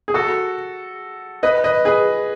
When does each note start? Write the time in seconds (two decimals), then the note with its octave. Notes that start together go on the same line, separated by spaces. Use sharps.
0.08 G#4
0.14 F#4 A4
1.43 B4 D#5
1.64 B4 D#5
1.85 G#4 B4